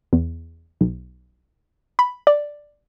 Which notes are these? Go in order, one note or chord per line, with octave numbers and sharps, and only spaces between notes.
E2
B1
B5
D5